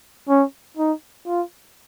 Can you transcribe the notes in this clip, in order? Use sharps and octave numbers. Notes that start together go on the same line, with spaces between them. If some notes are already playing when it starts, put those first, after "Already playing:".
C#4
D#4
F4